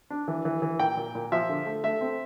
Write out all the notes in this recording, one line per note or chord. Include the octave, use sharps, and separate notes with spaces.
D4
E3
E3
E3
A#2 G5
A#2
A#2
F3 E5
D3
A3
A3 E5
C4